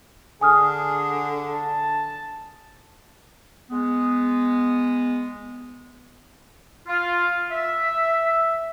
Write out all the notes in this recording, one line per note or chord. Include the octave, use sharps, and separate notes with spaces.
D3 G#4 G#5 D#6 F6
A5
G#3 B3
F4
E5